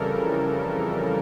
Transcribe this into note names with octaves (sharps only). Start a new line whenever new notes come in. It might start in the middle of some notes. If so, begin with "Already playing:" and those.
Already playing: F2 C#3 E3 G3 A4 A#4